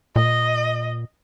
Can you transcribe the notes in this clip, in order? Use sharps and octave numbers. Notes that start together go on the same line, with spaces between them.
A#2 D#5